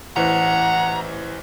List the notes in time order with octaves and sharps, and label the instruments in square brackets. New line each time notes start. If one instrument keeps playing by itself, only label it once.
[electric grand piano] A1 E3 C5 [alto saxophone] F#5 [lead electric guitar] A#5